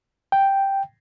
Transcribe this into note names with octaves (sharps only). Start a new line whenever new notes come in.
G5